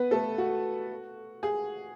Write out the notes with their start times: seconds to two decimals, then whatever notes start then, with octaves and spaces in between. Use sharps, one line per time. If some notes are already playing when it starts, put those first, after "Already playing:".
Already playing: B3 B4
0.11 A3 A4
0.38 F#4
1.43 G#4